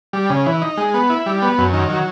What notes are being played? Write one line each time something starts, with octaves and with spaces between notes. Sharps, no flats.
G3
C#3
E3
D#4
G#3
B3
E4
G3
B3
F#2
D#3
F#3